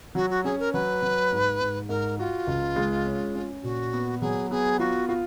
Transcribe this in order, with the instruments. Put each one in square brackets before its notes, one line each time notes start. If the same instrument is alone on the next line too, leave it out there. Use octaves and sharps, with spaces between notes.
[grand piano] F#3 [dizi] F#4
[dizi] F#4
[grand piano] C#4 [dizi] G#4
[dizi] A#4
[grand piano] F#3 [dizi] B4
[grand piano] F#3
G#2
G#2
[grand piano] G#2 [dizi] A#4
[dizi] F4 [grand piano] F#4
[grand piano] C#2
G#3
C#4
C#4
[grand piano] A#2 [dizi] F#4
[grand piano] B3
[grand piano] F#3 [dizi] G#4
[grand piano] B3 [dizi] G#4
[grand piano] F4 [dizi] F#4
[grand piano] F4 [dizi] F#4